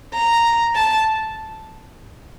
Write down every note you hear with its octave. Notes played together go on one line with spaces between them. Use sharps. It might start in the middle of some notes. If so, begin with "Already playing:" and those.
A#5
A5